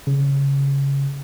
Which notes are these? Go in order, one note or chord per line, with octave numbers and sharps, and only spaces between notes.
C#3